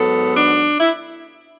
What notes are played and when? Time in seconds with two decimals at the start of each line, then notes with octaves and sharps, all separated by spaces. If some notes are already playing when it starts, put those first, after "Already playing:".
Already playing: G#2 F#3 B3 A4
0.37 D4
0.80 E4